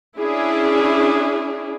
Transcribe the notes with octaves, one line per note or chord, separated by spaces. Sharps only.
C#4 D4 E4 G#4